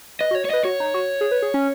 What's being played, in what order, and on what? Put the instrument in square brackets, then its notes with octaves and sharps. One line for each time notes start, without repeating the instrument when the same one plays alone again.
[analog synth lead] B4 [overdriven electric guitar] D#5
[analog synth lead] F#4
[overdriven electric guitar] C#5
C#5
[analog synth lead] B4 [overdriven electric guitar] D#5
[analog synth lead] F#4 [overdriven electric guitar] C#5
[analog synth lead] D#4
F#4
G#4
B4
G#4
C#4